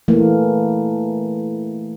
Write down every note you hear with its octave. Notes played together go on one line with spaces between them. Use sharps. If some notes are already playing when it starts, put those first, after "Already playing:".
E3 A3 A#3